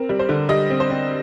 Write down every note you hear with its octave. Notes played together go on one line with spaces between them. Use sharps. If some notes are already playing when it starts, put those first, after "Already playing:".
Already playing: C4 A#4
G3
C5
D3
G3 D#5
C4
C5
C4